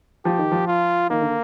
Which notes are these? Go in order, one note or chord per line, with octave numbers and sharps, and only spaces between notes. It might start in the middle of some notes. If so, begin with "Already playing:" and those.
F3 G4
D#3
F3
F4
D#3 A#3
D3